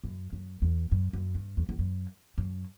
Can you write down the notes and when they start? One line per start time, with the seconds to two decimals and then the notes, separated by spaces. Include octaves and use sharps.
0.04 F#2
0.33 F#2
0.62 E2
0.91 F#2
1.13 F#2
1.35 G2
1.57 E2
1.69 E2
1.79 F#2
2.38 F#2